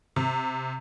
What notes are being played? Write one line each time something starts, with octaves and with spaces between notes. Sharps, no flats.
C3